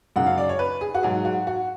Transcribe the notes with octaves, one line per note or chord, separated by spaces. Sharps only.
F#2 C#3 G#3 F#5
F5
D5
C#5
B4
G#4
F#4
G#2 F#3 G#4
F#4
F#4